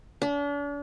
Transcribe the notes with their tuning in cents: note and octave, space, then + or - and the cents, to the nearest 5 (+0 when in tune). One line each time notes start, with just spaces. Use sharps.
D4 -40